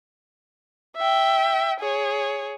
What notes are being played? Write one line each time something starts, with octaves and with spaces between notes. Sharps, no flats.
E5 G5
G#4 C#5